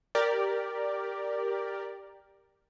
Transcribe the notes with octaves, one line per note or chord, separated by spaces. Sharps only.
G4 A#4 D5